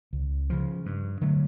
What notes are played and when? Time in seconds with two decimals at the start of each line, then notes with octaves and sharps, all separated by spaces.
0.13 C#2
0.50 C#3 F3
0.86 G2
1.21 D3 F#3 A3